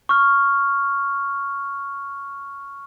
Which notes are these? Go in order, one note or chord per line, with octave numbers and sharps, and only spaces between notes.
C#6 F6